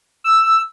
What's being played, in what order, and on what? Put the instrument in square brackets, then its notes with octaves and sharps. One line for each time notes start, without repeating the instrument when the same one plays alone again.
[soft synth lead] E6